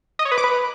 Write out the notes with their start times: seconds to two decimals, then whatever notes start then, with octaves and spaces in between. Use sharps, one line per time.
0.19 D#5
0.25 C#5
0.31 B4
0.38 D6
0.44 B4